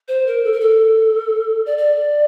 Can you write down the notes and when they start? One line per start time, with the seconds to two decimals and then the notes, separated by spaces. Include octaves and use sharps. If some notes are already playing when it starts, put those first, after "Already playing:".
0.08 C5
0.26 A#4
0.44 A4
0.52 A#4
0.60 A4
1.66 D5
1.78 D5